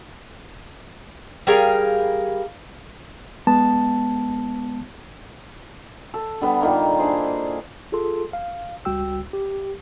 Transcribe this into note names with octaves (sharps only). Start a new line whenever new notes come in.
G3 G#4 A#4 F5
G#3 B3 A5
A4
D3 G3 B3
A#2 D#3 A#3
D4 E4 G#4 C5
F4 G#4 A4 C6
F5
C#2 G3 F#4 G5 E6
G4